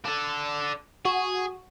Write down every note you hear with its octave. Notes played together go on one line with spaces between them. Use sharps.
D4 A4
F#4 G#4